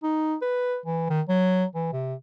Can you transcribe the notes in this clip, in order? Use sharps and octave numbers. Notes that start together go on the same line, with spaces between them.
D#4
B4
E3
D#3
F#3
E3
C3